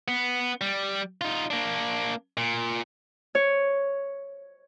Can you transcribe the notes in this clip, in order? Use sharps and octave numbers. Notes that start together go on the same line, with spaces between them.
B3
G3
D#4 F4
A#3 D4
A#2
C#5